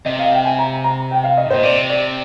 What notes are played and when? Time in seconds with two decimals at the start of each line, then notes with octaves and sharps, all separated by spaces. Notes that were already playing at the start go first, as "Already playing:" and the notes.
0.05 C3 D#5
0.19 F5
0.32 G5
0.45 G#5
0.59 A#5
0.84 A#5
1.11 G5
1.24 F5
1.37 D#5
1.46 G#2
1.50 A#2 C5
1.63 C3 D5
1.90 D5